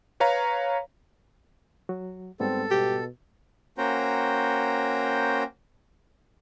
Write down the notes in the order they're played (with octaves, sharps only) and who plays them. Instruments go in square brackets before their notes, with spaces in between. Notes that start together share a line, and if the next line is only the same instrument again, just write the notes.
[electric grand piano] B4 C#5 F5 A#5
[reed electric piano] F#3 F#4
[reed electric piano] G#2 G3 B3 [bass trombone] C4 [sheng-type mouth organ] A4
[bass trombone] B2 [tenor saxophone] G4
[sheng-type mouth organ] A#3 C#4 F#4 C5 G5 A#5